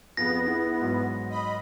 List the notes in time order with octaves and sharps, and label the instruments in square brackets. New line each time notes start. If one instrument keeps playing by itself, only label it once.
[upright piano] F2 G#4 [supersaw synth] B3 [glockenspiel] A#6
[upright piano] E4 G#4
G#2 F#3
[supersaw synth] D#5 B5